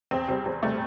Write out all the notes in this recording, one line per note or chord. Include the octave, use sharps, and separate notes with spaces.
E2 C4
C3 G3 C4
E2 C4
C3 G3 A3